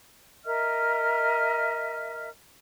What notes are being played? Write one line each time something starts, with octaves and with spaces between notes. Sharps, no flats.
A#4 D#5 E5 F6